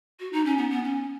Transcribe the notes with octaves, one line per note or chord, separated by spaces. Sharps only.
F#4
D#4
C#4
B3
B3
C#4